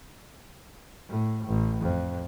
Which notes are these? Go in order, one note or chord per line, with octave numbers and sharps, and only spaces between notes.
A2
A1
F2